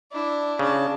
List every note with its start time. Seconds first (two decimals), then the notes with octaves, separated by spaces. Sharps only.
0.11 D4 E4
0.59 C#3 D4 A5